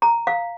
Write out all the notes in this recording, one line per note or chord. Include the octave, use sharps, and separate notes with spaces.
A#5
F5